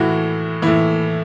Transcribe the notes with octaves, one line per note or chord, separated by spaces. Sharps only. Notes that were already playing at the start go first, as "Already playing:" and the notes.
Already playing: A2 E3 F#4
A2 E3 E4